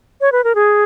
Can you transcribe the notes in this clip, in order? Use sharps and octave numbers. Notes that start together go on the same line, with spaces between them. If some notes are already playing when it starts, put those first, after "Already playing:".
C#5
B4
A#4
G#4